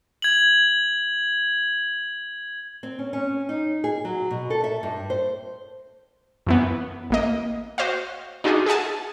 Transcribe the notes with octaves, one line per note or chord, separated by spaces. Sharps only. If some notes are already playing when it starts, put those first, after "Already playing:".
G#6 F#7
C4
C#4
C#4
D#4
G#4
F#3
B2
A4
E5
G2
C5
F#2 E3 B3
A1 A#3 D#5
F#4 C5 D#5 F5
D4 D#4 F4 F#4 G#4 D#5
G#4 E5 F#5 G#5 A5